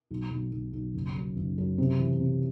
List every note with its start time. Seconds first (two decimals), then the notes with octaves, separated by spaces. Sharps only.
0.11 B1
0.31 B1
0.52 B1
0.73 B1
0.94 F#1
1.16 F#2
1.36 F#1
1.58 F#2
1.78 C3
1.99 E3
2.20 C3